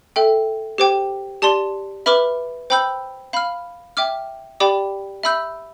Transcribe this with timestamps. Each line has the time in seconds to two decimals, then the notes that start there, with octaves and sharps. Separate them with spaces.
0.16 A4 E5 G5
0.78 G4 C5 G5 D6
1.42 G4 D5 A5 C6
2.06 B4 E5 B5 D6 F6
2.70 C5 G5 B5 E6 G6
3.33 F5 B5 F6
3.97 E5 G5 D6 F6
4.60 G4 D5 G5 B5 D6
5.23 E5 B5 E6 G6